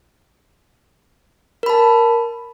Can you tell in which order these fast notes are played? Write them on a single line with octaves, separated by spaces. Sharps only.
A#4 B5 A5